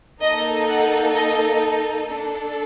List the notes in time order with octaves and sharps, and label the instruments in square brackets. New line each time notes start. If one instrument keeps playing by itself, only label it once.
[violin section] A#3 D#4 A4 D#5
F#5
D#5
A4
D4